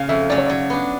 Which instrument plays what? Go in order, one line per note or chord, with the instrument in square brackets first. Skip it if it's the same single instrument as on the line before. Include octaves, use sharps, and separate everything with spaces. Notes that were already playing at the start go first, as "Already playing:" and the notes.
Already playing: [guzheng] C#3 [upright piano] F5
[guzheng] F2 [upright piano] E5
[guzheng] C#3 F#3 [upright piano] D5
[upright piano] C#5
[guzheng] F#3 [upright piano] D5
[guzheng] B3 D4